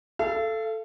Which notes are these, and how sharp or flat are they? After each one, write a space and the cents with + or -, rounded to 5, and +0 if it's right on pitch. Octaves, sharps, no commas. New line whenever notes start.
A4 +0 F5 -40